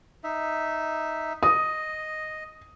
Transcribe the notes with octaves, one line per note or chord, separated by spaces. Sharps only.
D#4 E5
D#5 D#6